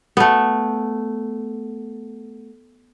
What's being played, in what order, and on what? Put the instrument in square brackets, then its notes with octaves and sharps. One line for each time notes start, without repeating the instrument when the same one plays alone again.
[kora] A3 B3